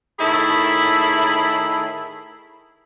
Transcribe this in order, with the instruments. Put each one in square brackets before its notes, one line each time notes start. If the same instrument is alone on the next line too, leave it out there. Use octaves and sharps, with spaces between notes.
[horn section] A2 D#3 E4 G#4 A5 B5